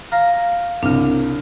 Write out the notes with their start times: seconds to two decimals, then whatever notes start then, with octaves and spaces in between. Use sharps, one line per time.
0.12 F5 A#5
0.83 C2 C#3 D4